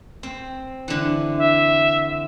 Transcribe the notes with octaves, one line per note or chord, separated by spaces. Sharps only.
C4
D3 E3
E5